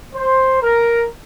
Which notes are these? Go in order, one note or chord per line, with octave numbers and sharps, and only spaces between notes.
C5
A#4